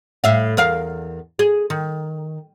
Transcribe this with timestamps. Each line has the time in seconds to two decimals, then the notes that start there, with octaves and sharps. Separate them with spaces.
0.24 A2 E5 F5
0.57 E2 A#4 F5
1.39 G#4
1.70 D#3